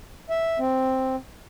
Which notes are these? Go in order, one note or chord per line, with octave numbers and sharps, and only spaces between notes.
E5
C4